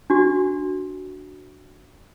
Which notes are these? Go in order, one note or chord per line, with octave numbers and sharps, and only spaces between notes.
D4 F#4